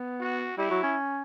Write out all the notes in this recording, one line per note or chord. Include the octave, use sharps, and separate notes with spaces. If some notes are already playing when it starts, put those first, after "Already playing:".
Already playing: B3
F#4
G3 E4
F#3
C#4